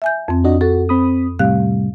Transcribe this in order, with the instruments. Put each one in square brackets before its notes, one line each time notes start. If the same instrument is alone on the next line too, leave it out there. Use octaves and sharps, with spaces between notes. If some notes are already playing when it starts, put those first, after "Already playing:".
[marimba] E5 G#5 G6
F2 C4
[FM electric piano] D4 F#4 D#5
[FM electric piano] F#4 [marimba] A4
[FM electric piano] C4 B5 D#6
[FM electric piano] A2 C3 G3 [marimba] F5 F#6